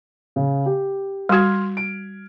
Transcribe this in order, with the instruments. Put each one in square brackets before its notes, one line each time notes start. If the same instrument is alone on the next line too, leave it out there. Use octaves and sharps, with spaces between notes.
[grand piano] C#3
G4
[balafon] G3 F#4 [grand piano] C6 F6 G#6
[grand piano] D7